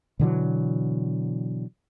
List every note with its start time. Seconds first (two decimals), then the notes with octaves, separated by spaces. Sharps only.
0.19 B2 D3 E3 F#3